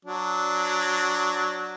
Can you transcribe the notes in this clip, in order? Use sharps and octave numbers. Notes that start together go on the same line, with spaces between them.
F#3 D4